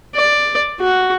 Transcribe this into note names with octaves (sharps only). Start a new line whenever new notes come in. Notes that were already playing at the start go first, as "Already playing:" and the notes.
D5
F#4